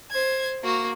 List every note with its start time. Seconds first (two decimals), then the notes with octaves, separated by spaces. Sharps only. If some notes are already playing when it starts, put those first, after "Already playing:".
0.11 C5 G#6
0.64 A#3 F#4